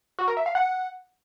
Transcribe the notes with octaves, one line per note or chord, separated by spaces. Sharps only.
F#4
A#4
E5
F5
F#5